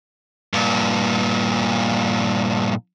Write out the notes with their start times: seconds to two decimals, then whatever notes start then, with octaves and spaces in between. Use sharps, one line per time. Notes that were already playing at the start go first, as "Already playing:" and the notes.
0.53 G2 A#2